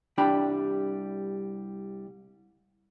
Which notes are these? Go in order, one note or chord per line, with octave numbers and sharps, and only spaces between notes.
C2 G3 D4 G5 B5